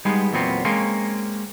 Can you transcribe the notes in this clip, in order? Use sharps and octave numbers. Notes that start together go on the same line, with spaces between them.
G3 G#3 B3 D#4 G#4
E2 A#2 F#3 B3 C4
G#3 A#3 C4 C#4